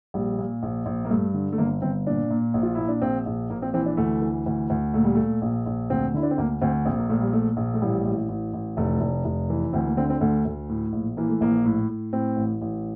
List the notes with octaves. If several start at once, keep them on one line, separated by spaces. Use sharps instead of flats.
A#1 G3
A#2
A#1
A#1
A#3
G2 A3
D3
A3
G1 A#3
G1 C4
A#2 D4
A#2
A#1
F4
A#2 E4
D4
A#1 C4
A#1
A#1 A#3
C4
E3 C4
D4
D2 A3
E3
D2
D2
A#2 A3
G3
A#2 A3
A#1
A#1
D2 C4
D3 E4
D4
C4
D2 A#3
D2 C4
A#1 C4
A#3
A#2 A3
G3
A#2 A3
A#1
A3
A1 G3
A1
A1
A1
F1 A3
F1
F1
E3
D2 C4
A#3
D3 C4
C4
D2 A3
D2
A2
A#1
E3 A#3
A3
A#1 A#3
A2
A2
A2 C4
A1
A1